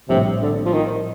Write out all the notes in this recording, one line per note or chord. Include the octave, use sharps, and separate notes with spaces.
A#1 A2 C3 G3 C4
D3
F3
D#3